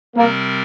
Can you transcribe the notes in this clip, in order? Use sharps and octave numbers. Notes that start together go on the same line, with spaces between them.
C3 G3 A#3 C4 A#4 D5